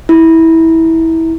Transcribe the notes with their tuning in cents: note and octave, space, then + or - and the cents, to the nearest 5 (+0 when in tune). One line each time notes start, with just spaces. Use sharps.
E4 -20